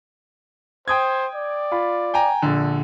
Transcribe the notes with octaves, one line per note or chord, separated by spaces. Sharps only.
C5 G5 D#6 G#6
D5
F4 B5
G5 G#5 A#5
A#1 D3